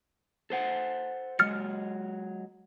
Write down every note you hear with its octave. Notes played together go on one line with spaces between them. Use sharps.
A4 C5 F#5
F#3 G#3 F6 A6 C#7